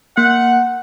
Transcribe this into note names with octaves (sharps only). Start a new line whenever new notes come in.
A#3 F#5